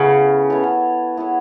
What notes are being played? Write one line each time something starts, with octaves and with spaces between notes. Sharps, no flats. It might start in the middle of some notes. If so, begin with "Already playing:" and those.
Already playing: C#3 B3 E4 A4 C#5
B3 E4 A4 C#5
B3 E4 A4 C#5